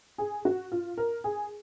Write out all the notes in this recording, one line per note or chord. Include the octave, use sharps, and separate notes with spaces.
G#4
F#4
F4
A#4
G#4